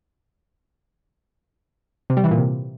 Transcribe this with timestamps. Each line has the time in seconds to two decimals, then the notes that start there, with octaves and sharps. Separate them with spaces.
2.10 C3
2.17 G3
2.24 E3
2.31 A#2
2.38 C3